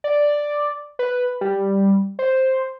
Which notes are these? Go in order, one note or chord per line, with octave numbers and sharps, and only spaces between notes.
D5
B4
G3
C5